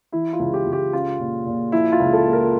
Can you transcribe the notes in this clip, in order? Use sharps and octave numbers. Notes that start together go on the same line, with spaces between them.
E3 E4
F4
C#2
G4
C#2
G4
C#4 F4
A#2
A#2
F3 E4
F4
C#2
A4
A#3
A#4